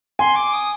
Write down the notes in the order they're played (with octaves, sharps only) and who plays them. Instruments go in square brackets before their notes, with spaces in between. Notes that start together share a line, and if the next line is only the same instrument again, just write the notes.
[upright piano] G#5 [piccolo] C6
[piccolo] D6
D#6